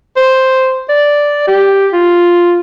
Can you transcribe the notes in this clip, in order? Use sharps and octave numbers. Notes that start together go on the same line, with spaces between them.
C5
D5
G4
F4